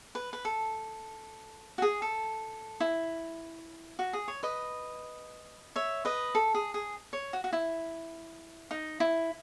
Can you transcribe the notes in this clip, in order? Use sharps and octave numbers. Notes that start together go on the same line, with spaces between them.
B4
B4
A4
F#4
G#4
A4
E4
F#4
G#4
C#5
B4 D#5
C#5 E5
B4 D#5
A4
G#4
G#4
C#5
F#4
F#4
E4
D#4
E4